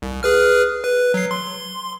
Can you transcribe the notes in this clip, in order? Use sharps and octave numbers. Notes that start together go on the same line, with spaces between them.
C2
G#4 B4 F6
B4
F#3 C7
C6